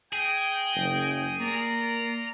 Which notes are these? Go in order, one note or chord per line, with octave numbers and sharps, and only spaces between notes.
G#4 D#5 G5
F#1
A#3 F4 D5 A#5